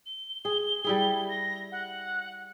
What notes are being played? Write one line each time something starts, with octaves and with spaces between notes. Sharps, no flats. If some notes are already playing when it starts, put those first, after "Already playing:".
G7
G#4
G3 E4 G#4
A#6
F#5